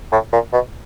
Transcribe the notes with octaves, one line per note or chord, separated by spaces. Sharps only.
A2
A#2
B2